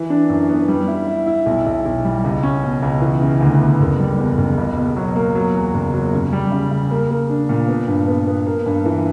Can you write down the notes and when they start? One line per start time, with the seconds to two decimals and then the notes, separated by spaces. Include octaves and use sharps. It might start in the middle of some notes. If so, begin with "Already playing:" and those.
Already playing: E3
0.10 D4
0.30 F#2
0.49 B3
0.68 G3
0.88 E4
1.07 E4
1.27 E4
1.46 B1
1.66 B1
1.86 B1
2.05 G3
2.24 C#2
2.43 C#4
2.63 B2
2.83 C#2
3.02 E3
3.21 C#3
3.41 D2
3.60 B3
3.80 F#1
4.00 G3
4.18 E2
4.38 F#1
4.58 C#2
4.77 B2
4.96 F#3
5.16 A#3
5.35 F#3
5.54 E2
5.74 F#1
5.94 F#3
6.13 C#3
6.33 G3
6.52 C#3
6.71 C#3
6.91 A#3
7.10 A#3
7.30 D4
7.49 A#2
7.69 B3
7.88 G2
8.08 B3
8.28 B3
8.46 A#3
8.66 G2
8.86 E3